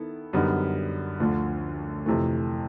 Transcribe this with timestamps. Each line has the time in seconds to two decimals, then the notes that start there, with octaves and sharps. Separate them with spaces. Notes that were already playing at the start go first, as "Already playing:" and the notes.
Already playing: D#3 B3 E4 A4
0.33 F#2 D3 G3 B3 D#4
1.20 D2 D3 F3 A3
2.06 F2 C3 E3 A3